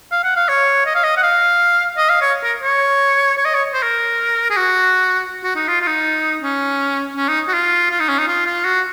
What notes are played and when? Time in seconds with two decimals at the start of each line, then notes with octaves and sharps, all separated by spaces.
0.12 F5
0.24 F#5
0.36 F5
0.49 C#5
0.86 D#5
0.95 F5
1.04 D#5
1.17 F#5
1.23 F5
1.97 D#5
2.09 F5
2.22 C#5
2.43 A#4
2.62 C#5
3.37 C#5
3.45 D#5
3.54 C#5
3.73 C5
3.83 A#4
4.50 G#4
4.57 F#4
5.43 F#4
5.55 D#4
5.68 F4
5.81 F4
5.87 D#4
6.42 C#4
7.16 C#4
7.28 D#4
7.48 F#4
7.53 F4
7.90 F4
8.00 D#4
8.08 C#4
8.18 D#4
8.27 F4
8.45 F4
8.65 F#4